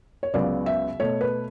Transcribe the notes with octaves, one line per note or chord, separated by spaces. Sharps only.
C#5
C#2 C#3 F#3 B3 D5
E5
B2 A3 C#5
B4